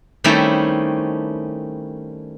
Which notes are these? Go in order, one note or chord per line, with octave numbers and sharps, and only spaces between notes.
D#3 G3 A3 C4 C#4 E4